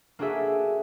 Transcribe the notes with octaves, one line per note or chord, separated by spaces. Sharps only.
A#3 D4 F#4 G#4 A4 E5